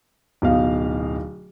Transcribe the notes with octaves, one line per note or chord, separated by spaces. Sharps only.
D1 B2 D#4 F5